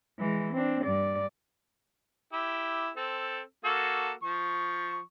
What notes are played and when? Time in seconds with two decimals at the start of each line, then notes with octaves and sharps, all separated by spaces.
0.19 E3 G#3
0.53 C4 D4
0.84 G2 D5
2.33 E4 G4
2.97 C4 A4
3.65 A#3 F#4 A4
4.23 F3 C#6